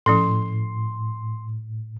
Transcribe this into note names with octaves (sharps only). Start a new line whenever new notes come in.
A2 F3 C#4 A4 C6